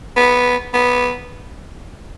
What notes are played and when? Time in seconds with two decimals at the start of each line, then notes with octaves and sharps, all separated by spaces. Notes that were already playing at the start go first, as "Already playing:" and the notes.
0.16 B3
0.74 B3